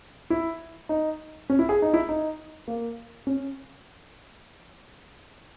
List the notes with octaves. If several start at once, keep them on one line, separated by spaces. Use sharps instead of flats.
E4
D#4
C#4
E4
G#4
D#4
E4
D#4
A#3
C#4